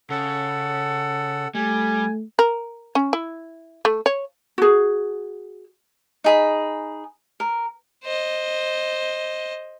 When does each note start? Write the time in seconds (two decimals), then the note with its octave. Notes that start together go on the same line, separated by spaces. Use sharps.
0.10 C#3 A4 F#5
1.55 G3 A3 G#5
2.39 A#4
2.95 C#4
3.13 E4
3.85 A3
4.06 C#5
4.58 F#4 G#4
6.24 D#4 G#4 B5
7.40 A#4
8.04 C5 D#5